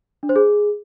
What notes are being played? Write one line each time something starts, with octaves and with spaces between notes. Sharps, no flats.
D4
C5
G#4